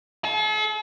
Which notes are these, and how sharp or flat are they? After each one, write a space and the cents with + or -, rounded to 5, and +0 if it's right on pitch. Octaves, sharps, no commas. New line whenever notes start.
A4 -45